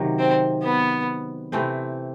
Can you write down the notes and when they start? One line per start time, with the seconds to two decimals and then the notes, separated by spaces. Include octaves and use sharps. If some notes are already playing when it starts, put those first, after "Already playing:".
Already playing: C3 D#3 F#3
0.19 C4
0.63 B3
1.52 C3 E3 A3 C4